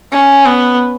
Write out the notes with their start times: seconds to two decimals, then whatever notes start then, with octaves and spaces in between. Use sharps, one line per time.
0.12 C#4
0.46 B3